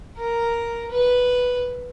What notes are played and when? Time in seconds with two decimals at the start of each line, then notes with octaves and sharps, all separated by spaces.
0.18 A#4
0.91 B4